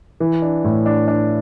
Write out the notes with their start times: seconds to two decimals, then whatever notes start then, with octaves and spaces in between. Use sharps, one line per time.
0.20 E3
0.42 D4
0.64 A2
0.86 D4
1.08 D4